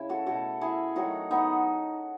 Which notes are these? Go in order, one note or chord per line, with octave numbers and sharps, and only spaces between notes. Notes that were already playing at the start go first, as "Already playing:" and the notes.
Already playing: C#3 E4
F#4 A4
B2 A3 F#4 A4
E4 G#4
D#3 F#3 A3 D#4 F#4
B3 D#4